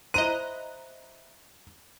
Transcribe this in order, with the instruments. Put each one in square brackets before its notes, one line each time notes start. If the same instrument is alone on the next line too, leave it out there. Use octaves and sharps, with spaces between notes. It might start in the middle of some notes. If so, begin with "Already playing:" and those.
[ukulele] E4 C5 [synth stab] D#5 A#5 F#6 [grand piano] D#7